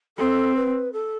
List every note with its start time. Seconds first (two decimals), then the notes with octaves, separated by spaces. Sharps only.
0.17 C4 A4
0.55 B4
0.92 A4